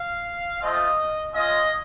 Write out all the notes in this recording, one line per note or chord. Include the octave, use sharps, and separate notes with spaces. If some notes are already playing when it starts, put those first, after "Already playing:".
Already playing: F5
A3 C4 F4 D#5
G#3 C#4 F4 D#5